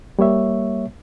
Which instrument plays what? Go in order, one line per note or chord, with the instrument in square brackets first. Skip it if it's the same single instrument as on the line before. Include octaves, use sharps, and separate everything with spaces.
[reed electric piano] G3 A#3 C#5 E5